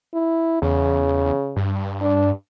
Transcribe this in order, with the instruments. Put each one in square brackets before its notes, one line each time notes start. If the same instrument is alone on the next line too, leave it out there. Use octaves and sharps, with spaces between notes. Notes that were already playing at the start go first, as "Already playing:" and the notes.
[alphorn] E4
[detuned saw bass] E2 [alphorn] C#3
[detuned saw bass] G2
[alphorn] D4